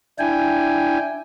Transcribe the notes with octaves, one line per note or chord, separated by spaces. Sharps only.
D4 E4 G5 G#5